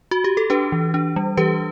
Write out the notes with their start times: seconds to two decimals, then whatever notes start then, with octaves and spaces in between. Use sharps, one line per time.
0.11 F#4
0.24 G4
0.37 A4
0.50 D4 G4 B4
0.72 E3
0.94 D4
1.16 G3
1.37 E3 G4 B4